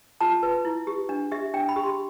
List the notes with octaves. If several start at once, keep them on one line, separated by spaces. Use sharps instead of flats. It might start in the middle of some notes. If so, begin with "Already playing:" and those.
F4 A5
B4
E4
G4
D4
G4 E5
D4 G5
B5
G4
C6